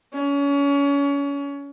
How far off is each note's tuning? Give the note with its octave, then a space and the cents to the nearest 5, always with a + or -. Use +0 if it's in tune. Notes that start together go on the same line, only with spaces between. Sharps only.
C#4 +30